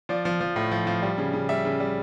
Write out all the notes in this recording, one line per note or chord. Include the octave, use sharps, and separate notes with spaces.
F3 D5
F3
F3
A2
F3
F3
G3
C#3
C#3
G3 E5
C#3
G3